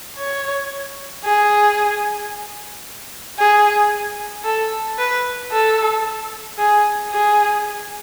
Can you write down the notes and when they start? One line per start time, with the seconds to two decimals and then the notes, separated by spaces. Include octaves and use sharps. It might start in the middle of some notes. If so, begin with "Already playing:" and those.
0.18 C#5
1.25 G#4
3.38 G#4
4.45 A4
4.98 B4
5.52 A4
6.58 G#4
7.12 G#4